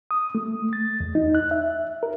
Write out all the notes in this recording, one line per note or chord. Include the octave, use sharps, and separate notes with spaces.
D#6
A3
A6
E2
D#4
F#6
E5
A#4